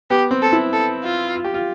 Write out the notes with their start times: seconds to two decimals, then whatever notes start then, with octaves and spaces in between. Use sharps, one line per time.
0.10 B3 G4
0.31 C4
0.42 A4
0.52 E4
0.73 A4
1.04 F4
1.35 F4
1.44 G4
1.54 F4